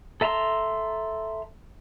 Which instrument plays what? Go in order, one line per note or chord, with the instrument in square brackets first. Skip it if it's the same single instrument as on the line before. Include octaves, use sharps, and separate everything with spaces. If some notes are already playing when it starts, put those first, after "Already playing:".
[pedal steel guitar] A4 E5 A5 A#5 C6